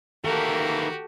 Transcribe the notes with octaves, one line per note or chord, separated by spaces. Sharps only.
D#3 E3 A#3 F#4 G4 A4